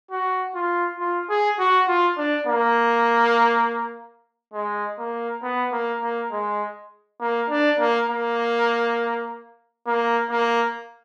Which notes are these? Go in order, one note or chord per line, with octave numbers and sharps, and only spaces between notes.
F#4
F4
F4
G#4
F#4
F4
D4
A#3
G#3
A#3
B3
A#3
A#3
G#3
A#3
D4
A#3
A#3
A#3
A#3